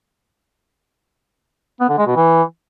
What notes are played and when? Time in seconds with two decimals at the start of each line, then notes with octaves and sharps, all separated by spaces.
1.80 B3
1.89 D3
1.98 G#3
2.07 B2
2.16 E3